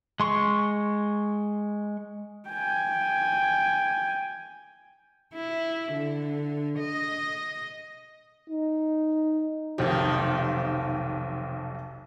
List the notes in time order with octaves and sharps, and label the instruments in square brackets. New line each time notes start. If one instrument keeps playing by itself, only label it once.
[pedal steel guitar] G#3 C6 C#6
[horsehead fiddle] G5 G#5
[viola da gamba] E4
D3
D#5
[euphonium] D#4
[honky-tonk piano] F1 B1 G4 [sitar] D#3 F3